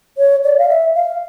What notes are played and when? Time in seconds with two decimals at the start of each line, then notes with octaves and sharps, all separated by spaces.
0.18 C#5
0.44 D5
0.58 F5
0.69 E5
0.95 F5